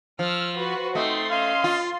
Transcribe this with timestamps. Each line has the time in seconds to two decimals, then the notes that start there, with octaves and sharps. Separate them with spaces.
0.19 F3 E6 F6
0.57 F#4 B4
0.95 A3 C4 D#4 C6
1.30 C#4 D#5 F5
1.64 F4